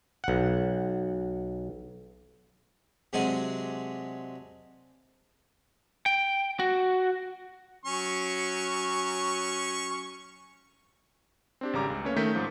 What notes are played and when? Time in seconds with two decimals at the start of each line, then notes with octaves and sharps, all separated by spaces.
0.24 B1 F#5
3.13 C3 F#3 G#3 D4 G#4 G#5
6.06 G5
6.60 F#4
7.86 F#3 C#4 C#6
11.61 C4 D4 G4
11.73 G#1 C#3 G3 A#5 D6
11.90 C#2
12.05 A3 A#3 C#4 B4 C#5
12.16 D#3 A3 A#4 A5 G6 B6
12.34 G#2 F3 G6